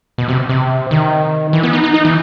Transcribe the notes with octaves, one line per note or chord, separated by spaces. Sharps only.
B2
C3
C3
D#3
E3
B3
D#4
D#4
D#4
E3